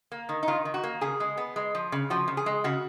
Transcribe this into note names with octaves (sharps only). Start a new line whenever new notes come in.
A#3
D#3
D#4
D#3 F4
D#3
F#4
A#3
C#3 G#4
G#3
B3
G#3
F3
C#3
F3 F#4
C#3
G#4
G#3
C#3 F#4